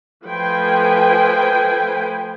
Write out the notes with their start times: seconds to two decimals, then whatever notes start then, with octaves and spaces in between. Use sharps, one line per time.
0.23 F3 A3 B4 C5 G5 G#5